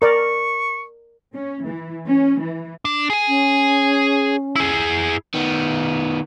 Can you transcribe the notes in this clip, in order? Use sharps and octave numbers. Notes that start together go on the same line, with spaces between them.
A#4 D5 C#6
C#4
E3
C#4
E3
D4
G#4 G#5
C#4
E4 G#4
D#3 B3